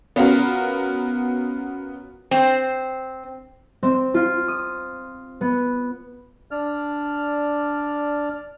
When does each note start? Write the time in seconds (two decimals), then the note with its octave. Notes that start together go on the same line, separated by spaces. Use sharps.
0.16 B3 C#4 F4 F#4 A#4
2.31 C4
3.83 C4
4.14 F4
4.48 D#6
5.41 B3
6.51 D4 D5 F6